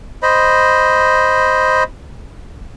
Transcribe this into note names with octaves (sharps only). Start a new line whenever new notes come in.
C5 D#5 B5